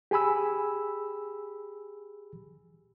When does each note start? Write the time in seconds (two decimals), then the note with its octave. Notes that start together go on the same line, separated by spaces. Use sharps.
0.11 G4 G#4 G#5 B5 E6